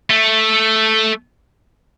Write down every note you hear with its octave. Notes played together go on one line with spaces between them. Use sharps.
A3